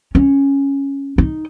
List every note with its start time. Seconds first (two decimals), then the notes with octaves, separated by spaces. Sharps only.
0.15 C#4
1.18 D#4